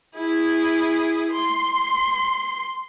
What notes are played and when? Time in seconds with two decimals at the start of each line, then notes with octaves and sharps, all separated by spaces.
0.16 E4 G#4
1.31 C6